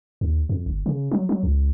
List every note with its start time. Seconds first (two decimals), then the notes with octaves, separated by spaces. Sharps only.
0.21 D#2
0.49 F2
0.66 G1
0.86 C#3
1.11 F#3
1.29 F#3
1.43 C#2